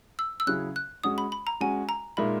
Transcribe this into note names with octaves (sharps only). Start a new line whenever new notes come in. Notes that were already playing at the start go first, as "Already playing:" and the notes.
E6
E6
C#3 F#3 C#4 E4 G#4 F#6
F#6
G#3 C#4 F#4 D#6
B5
B5
A#5
G#3 C#4 F#4 G#5
A#5
A#2 G#3 D#4 A#4 E5 B5